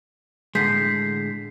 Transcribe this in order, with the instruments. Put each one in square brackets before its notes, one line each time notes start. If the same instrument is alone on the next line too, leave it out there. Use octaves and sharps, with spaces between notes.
[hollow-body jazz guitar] A2 D3 G#3 [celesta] G6 B6 C7